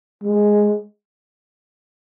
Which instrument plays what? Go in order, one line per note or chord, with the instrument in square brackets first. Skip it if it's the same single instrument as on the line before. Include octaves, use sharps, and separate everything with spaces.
[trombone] G#3